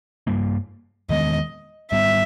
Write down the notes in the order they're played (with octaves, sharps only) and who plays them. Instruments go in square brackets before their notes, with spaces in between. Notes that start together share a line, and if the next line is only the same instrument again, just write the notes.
[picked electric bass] G2 G3 A#3
[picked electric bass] E2 D#3 G#3 B3 [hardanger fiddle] D#5
[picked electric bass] G#2 G3 B3 [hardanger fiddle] E5